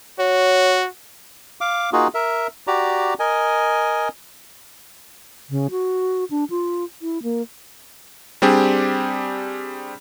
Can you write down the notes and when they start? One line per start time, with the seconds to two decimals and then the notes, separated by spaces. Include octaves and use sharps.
0.19 F#4 C#5
1.61 F5 D6
1.93 A#3 D#4 F4 F#4 G#4
2.14 A#4 E5
2.67 F#4 G4 D5 A#5
3.19 A#4 D#5 G#5
5.50 C#3
5.71 F#4
6.31 D4
6.50 F4
7.02 E4
7.23 A#3
8.42 G3 C4 D4 G4 G#4